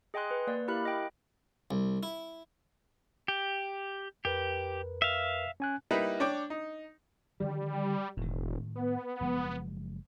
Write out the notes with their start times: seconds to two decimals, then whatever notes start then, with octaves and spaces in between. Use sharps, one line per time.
0.14 G#4 D#5 G5 G#5 C6 F#6
0.31 B4
0.47 A#3 D5
0.68 E4 G4 A#4 F5 B5 F#6
0.85 D#5 G5
1.71 C2
2.03 E4
3.28 G4
4.25 F2 G4 A#4 B4
5.02 E5 F5
5.60 C#4 G#5 F#6
5.91 G3 A#3 D#4 E4 B4
6.20 D4 C#5 G5 D6
6.50 D#4
7.40 D3 D#3 F3 G3
8.17 E1 A2 D#3
8.76 B3
9.21 F#1 F3 G#3